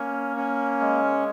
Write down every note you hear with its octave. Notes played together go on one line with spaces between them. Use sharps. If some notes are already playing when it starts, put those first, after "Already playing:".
Already playing: A#3 C#4
C#4
G#3